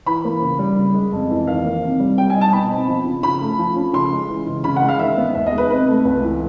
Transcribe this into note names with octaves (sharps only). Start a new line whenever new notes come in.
E3 B5
A#3
C#3
G3
C#3
G#3
F2
E3
D#3 F5
A#3
C3
G3
G3 G5
G#5
D#4
A5
B2 B5
C4
F3
C#3
C#3 B5
A3
F3
C#4
C#3 C6
G#3
E3
C#3
C#3 B5
F#5
G#3
F5
D#3 E5
B3
D#2 E5
D#5
G#3
B4
C3 B4
A3
C#2
E3